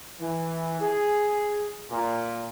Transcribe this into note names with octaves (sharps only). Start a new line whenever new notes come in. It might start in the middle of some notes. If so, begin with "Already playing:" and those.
E3
G#4
A#2